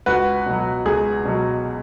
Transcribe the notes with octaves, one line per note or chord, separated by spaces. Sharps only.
C#2 F#4 B4
B2 F#3
C#2 G#4
B2 F#3